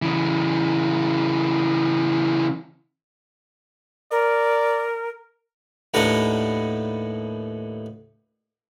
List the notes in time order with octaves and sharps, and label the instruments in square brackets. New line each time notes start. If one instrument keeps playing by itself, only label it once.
[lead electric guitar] C#3 E3
[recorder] A#4 [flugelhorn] D5
[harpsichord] D#2 A2 D4 B4 F#5 A#5